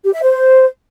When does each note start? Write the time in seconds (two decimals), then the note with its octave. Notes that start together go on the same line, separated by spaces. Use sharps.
0.04 G4
0.13 E5
0.22 C5